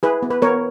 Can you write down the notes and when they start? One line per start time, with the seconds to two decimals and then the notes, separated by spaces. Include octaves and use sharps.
0.03 E4 G#4 B4
0.22 B3
0.30 B4
0.42 B3 A#4 C#5